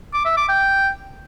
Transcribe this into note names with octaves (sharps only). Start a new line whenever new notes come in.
D6
E5
D6
G5